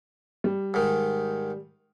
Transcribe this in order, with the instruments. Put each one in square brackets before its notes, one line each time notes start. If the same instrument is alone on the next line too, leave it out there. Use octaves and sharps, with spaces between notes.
[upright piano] G3
[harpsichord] G#2 D#3